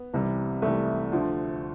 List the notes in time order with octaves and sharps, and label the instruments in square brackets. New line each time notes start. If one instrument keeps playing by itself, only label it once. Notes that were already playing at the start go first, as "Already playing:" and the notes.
Already playing: [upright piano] B3
C2 C3 E3 G3
C2 C3 E3 G3 A3
D2 D3 F3